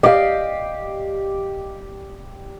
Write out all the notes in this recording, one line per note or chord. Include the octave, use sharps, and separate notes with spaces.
G4 D5 D#5 F5